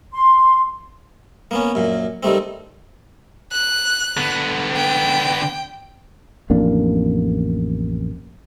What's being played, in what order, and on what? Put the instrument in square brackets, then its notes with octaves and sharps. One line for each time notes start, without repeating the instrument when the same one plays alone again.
[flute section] C6
[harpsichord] A#3 B3 C#4
F#2 A#2
D#3 G3 A3 C4
[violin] F#6
[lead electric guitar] D3 B3
[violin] G5
[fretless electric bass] A1 F2 A#3 D4